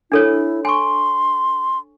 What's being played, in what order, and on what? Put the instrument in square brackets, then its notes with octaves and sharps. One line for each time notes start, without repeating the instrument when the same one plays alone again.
[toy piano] D4 A4 C#5 [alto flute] E4
[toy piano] G#5 C#6 [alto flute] C6